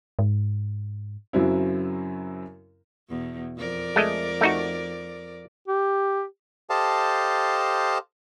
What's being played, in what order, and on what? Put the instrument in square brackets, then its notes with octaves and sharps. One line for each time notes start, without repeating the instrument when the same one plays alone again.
[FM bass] G#2
[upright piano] F#2 C#3 F#3 C4 E4
[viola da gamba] E2 B2
F2 A#4 D5
[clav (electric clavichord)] G#3 A3 D#5
A3 D#4 F#4
[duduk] G4
[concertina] G4 A4 C5 D#5 F5 A5